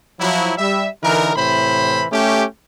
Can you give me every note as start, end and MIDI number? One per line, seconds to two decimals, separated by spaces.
0.19 0.52 53
0.19 0.52 54
0.19 0.52 64
0.58 0.87 55
0.58 0.87 76
1.03 1.32 50
1.03 1.32 52
1.03 1.32 63
1.03 1.32 70
1.36 2.06 45
1.36 2.06 48
1.36 2.06 52
1.36 2.06 72
1.36 2.06 83
2.11 2.44 57
2.11 2.44 61
2.11 2.44 67